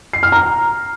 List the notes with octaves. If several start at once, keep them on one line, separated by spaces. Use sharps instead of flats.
C7
F6
A#5